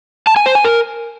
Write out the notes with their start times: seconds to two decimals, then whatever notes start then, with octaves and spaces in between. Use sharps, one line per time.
0.27 A5
0.36 G#5
0.46 C5
0.55 G#5
0.65 A#4